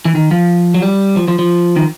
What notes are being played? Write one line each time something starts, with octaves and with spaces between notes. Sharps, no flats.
E3
D#3
F3
F#3
G3
F3
F3
F3
D#3